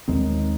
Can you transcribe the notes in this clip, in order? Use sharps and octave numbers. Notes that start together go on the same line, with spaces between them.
D#2 D#3 G#3 C4